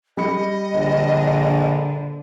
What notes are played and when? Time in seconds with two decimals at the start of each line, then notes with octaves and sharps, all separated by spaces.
0.17 G3 D#5 B5 C#7
0.74 A#1 D3